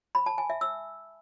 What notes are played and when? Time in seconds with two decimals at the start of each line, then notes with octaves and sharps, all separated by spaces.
0.15 B5
0.26 A5
0.38 G#5
0.50 E5
0.61 E6